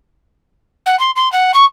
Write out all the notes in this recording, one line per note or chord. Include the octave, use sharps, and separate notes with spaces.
F#5
C6
C6
F#5
C#6